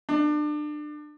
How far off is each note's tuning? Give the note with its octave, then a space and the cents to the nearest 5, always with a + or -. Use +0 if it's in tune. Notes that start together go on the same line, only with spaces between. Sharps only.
D4 +30